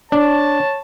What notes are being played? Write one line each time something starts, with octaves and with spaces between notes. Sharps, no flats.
D4 C#5 A5